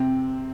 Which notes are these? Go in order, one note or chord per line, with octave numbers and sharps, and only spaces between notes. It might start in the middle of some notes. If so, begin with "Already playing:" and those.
Already playing: C3 C4